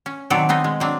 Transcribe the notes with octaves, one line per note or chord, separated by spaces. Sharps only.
C#4
B2 D#3 F#3 C4 A4 D5
B3 C4 D#4 D#5
G#3
F#3 C4 D4